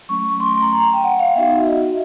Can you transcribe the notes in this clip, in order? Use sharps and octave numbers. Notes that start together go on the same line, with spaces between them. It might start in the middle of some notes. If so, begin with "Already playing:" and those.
F#3 A3 C#4 C#6
C6
C6
A#5
G5
F#5
F5
B3 D#4 F#4 E5
D#5